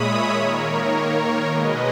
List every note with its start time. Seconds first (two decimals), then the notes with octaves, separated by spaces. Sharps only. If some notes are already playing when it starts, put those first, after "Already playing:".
Already playing: A#2 G#3 C#5 E5 B5 D#6
0.32 D#3 A#3 A#4 C#5
1.48 B2 G#3 B4 D#5